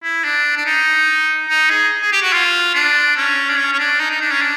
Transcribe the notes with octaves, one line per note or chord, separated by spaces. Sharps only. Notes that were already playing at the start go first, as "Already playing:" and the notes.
E4
D4
D4
D#4
D#4
G#4
G#4
G4
F#4
F4
D4
C#4
D4
C#4
C#4
D4
D#4
D#4
D4
C#4
D4